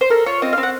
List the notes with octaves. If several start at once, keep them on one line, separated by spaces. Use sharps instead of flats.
C5
A4 A#4
F4 C#5
C4 D#5
C4 F5
F#5